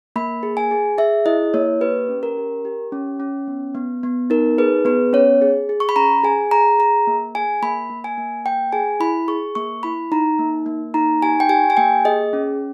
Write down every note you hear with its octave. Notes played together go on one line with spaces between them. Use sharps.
A#3 B5
G#4
G#5
G#4
G#4 E5
E4 D#5
A#3 C#5
G4 B4
C#4
A#4
G4
G4
C#4
C#4
B3
B3
B3
D#4 A#4
G#4 B4
B3 B4
C#4 C#5
G#4
G#4
C#6
B5
C#4 A#5
G#4 G#5
G#4 A#5
G#4 A#5
A#3
G#4 G#5
A#3 B5
A#3
G#5
A#3
A#3 G5
G#4 G#5
E4 B5
G#4 C#6
A#3 C#6
E4 B5
D#4 A#5
A#3
A#3
D#4 A#5
G4 G#5
G5
G4 G#5
G#5
A#3 G5
G#4 D#5
C#4